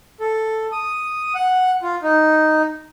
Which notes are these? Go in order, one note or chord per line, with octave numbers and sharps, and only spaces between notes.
A4
D#6
F#5
F4
D#4